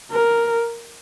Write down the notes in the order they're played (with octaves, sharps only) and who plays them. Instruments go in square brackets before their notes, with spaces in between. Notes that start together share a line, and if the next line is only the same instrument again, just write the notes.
[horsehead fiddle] A#4